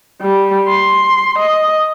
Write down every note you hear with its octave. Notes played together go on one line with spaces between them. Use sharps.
G3
C6
D#5